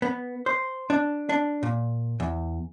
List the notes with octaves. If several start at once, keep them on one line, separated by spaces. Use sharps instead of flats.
B3
C5
D4
D4
A#2
E2